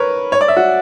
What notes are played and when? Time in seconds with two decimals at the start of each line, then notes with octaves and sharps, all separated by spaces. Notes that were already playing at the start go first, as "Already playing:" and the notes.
Already playing: A#4 B4 C#5
0.32 C#5
0.41 D5
0.48 E5
0.57 F#4